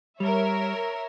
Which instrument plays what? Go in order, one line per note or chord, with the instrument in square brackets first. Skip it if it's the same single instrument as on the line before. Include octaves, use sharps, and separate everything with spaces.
[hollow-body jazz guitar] G3 [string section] A#4 C#5 E5